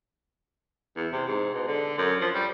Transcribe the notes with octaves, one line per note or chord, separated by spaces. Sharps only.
E2
C3
G#2
B2
D3
F#2
F3
G3